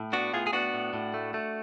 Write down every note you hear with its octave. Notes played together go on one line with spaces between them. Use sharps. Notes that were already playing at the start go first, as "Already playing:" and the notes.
Already playing: A2
B3 D4 F#4
A2 F4 G#4
G#4
B3 D4 F#4
A2
A2
A3
A3